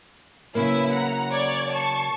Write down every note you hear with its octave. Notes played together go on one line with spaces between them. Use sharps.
C#3 F#3 A#3 E4 B4 E5
F#5 A#5
C#5 D5 G#6
A5 C#6